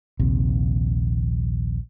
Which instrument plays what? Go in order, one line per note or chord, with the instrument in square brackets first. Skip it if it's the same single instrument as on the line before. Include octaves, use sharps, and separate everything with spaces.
[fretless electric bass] A#1 D#2 C3